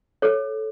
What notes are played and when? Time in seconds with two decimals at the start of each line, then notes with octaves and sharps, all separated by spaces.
0.22 A4 C#5